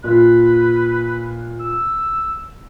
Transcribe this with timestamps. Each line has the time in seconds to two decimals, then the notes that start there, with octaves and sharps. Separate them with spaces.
0.04 A#2 F4 B4
1.60 E6